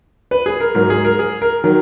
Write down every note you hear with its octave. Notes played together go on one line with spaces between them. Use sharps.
B4
G#4
A#4
G#2 F#3 A#4
G#4
A#4
G#4
A#4
D#3 F#3 A#4